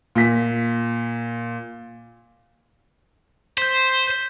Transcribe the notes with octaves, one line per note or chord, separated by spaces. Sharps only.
A#2 B6
C5 G6 B6